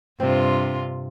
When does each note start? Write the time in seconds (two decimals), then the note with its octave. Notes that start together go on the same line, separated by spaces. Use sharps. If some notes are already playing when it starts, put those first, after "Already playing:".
0.20 G2 C3 C4 F4